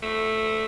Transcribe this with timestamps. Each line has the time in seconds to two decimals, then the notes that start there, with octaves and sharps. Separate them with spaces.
0.02 A3